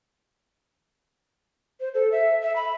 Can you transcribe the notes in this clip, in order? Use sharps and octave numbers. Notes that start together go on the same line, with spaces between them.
C5
A4
E5
E5
B5